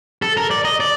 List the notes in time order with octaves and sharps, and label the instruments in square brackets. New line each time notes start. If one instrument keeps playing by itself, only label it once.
[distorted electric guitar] A4
A#4
D5
D#5
D5